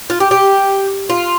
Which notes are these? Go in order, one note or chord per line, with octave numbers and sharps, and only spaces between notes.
F4
G4
G4
F4